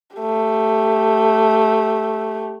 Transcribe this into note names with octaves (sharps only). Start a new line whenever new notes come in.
A3 G4